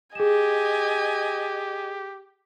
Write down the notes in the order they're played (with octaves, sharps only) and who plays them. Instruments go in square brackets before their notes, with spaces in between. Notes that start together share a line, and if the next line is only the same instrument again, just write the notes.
[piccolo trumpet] G4 [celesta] G#4 E7 [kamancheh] D#5 G#5